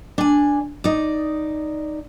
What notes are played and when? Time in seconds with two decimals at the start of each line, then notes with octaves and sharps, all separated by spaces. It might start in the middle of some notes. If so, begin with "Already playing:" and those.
0.18 D4 G#5
0.84 D#4 D5